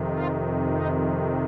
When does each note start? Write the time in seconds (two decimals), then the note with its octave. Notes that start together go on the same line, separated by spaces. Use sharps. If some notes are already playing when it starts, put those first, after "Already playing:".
Already playing: F2 C3 D#3
0.09 F4
0.70 D#4